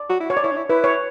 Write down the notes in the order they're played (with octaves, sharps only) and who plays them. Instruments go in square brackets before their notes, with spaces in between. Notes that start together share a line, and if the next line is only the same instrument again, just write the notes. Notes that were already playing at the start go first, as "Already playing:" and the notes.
Already playing: [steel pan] D5
[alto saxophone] F#4
E4
[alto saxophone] F#4 [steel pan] C#5
[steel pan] D5
[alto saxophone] E4 [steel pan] C#5
[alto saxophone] D4
E4
[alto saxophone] E4 [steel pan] B4
[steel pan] C#5